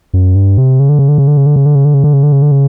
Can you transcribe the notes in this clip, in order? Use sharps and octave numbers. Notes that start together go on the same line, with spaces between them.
F#2
G2
C3
C#3
D3
C#3
D3
C#3
D3
C#3
D3
C#3
D3
C#3
D3
C#3
D3
C#3
D3
C#3
D3
C#3